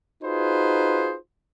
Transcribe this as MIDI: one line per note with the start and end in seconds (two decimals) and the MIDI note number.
0.24 1.16 63
0.24 1.16 65
0.24 1.16 66
0.24 1.16 68
0.24 1.16 71
0.24 1.16 72